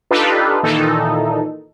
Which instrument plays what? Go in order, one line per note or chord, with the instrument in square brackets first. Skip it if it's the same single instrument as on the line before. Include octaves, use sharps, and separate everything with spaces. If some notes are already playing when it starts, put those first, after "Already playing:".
[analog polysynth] D4 D#4 F4 G4 A4 B4
A#2 D#3 E3 D#4 A4